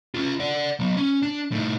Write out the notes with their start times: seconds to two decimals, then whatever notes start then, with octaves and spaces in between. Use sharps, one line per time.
0.15 C#4 F4
0.40 D5 F#5
0.80 F#3 B3
0.97 C#4
1.23 D4
1.52 A2 D#4